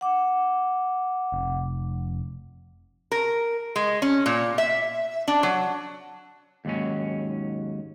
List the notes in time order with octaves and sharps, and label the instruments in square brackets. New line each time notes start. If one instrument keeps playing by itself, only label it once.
[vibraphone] F#5 D6
[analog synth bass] F1
[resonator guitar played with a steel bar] A#4
G#3
C#4
A#2
E5
D4
F#3
[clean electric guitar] D#2 G#2 F#3 C#4